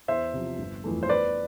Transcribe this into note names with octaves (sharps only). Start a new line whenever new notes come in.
E2 C5 E5
C3 F3
G1
F2 E3 A3
C5
E2 B4 D5